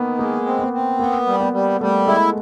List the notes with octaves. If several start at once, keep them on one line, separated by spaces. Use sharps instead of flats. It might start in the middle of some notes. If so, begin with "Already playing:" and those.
Already playing: D#3 A#3 B3
G#3 A#3
C4
B3
C4
A#3 B3
G3
B3
G3
G3 A3
G#3 E4